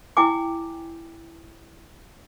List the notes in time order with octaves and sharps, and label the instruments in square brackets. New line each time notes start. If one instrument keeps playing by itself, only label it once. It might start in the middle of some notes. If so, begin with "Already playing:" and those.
[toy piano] E4 G5 G#5 D6